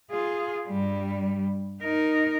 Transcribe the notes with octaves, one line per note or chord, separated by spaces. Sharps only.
F4 G#4
G2 G3
D#4 A#4